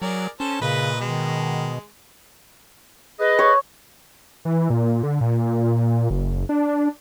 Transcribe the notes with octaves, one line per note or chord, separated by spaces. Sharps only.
F#3 G#4 A#4 D5
C#4 A4 C5 A5
A#2 C#3 B4 D#5 B5
B2 D#3 G#3
G#4 B4 D#5
C#5
E3
A#2
D3
A#2
F#1
D4